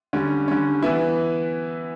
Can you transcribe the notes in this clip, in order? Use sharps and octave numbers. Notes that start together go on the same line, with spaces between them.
D3 G3 C#4
D3 G3 C#4
E3 B3 E4